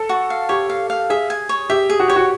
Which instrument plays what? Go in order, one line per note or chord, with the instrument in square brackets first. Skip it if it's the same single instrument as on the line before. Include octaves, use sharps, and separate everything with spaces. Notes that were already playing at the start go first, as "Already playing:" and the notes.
Already playing: [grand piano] A4
[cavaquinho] F#4
F5
[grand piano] G4 [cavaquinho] C#5
[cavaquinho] F5
F5
[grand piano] G#4 [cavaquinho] E5
[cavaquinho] G#5
C#5
[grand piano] G4 [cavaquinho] E5
[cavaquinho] G#4
[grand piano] F#4
[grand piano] G4 [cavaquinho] C#5
[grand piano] F#4